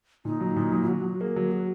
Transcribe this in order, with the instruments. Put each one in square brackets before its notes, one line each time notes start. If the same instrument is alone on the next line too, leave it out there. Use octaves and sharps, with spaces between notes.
[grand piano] A#2 [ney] D#4
[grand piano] F#3
A#2
F#3
[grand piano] F#3 [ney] F#4
[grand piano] F#3
[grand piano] A#3 [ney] G#4
[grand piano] F#3
[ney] F#4